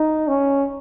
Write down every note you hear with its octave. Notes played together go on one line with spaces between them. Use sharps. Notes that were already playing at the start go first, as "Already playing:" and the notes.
Already playing: D#4
C#4